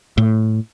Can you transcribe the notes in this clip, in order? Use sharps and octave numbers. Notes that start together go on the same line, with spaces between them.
A2